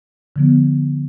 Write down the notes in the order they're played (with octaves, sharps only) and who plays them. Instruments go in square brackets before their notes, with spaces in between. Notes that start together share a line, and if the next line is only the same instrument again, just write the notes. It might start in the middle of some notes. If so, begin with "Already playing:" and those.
[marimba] D3 F3 B3